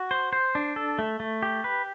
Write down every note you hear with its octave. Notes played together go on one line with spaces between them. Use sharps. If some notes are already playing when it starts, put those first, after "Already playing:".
Already playing: F#4
C5
C5
D4
A4
A3
A3
G4
B4